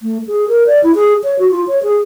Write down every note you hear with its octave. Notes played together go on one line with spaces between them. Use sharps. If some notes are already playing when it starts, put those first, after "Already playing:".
A3
G#4
A#4
D5
E4
G#4
C#5
F#4
F4
C#5
G#4